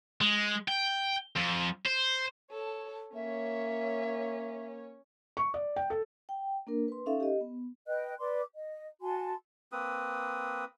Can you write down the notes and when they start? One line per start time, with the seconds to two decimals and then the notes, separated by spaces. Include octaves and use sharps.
0.21 G#3
0.68 G5
1.36 F2
1.86 C5
2.51 A4 C#5
3.15 A#3 C#4 C#5 E5
5.37 C#6
5.54 D5
5.76 G5
5.90 A4
6.29 G5
6.67 A#3 D4 A#4
6.88 B4 C6
7.06 C#4 D#4 A4 E5 F5
7.20 G4 D#5
7.41 B3
7.86 B4 D#5 G5 F#6
8.19 B4 D5 C6 D6
8.55 D#5
9.02 F#4 G#5 A5 C6
9.72 A#3 C4 B4 D#6